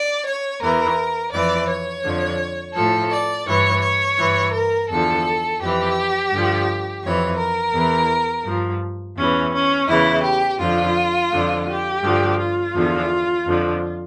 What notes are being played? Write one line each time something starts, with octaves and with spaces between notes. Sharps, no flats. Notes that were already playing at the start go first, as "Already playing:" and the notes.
Already playing: D5
C#5
E2 E3 A#4
F2 E3 D5
C#5
F2 D3 F3
A2 F3 A4
D5
G2 E3 C#5
C#5
G2 E3
A#4
E2 D3 F3 A4
F2 E3 G4
G2 D3 F3
F2 E3 C#5
A#4
E2 E3
G2 F3
E2 E3 C#4
C#4
E2 C#3 E3 E4
G4
F2 D3 F3 F4
F2 D3 F3
G4
G2 D3 F3
F4
E2 D3 F3
F2 D3 F3